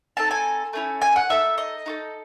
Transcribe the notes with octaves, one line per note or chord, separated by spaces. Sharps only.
C4 D#4 A4 A5
G#5
A3 C#4 E4
G#5
F#5
D#4 A4 E5
D#5
D#4 F#4 A4